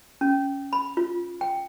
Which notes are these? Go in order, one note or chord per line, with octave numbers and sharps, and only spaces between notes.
C#4
B5
F4
G5